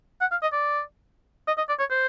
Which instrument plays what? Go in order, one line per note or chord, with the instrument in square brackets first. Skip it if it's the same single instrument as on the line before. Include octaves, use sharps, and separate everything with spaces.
[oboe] F#5
F5
D#5
D5
D#5
D#5
D5
C#5
C5